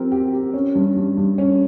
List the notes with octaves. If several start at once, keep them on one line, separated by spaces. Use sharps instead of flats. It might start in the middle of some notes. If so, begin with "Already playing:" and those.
Already playing: F3 C4 G4 A#4
G4
G4
C#4
G2
G2
G2
C#4